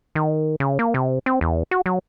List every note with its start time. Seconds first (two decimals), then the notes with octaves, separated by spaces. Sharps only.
0.15 D#3
0.60 C#3
0.79 A#3
0.94 C3
1.26 C4
1.41 E2
1.71 F#4
1.86 F#3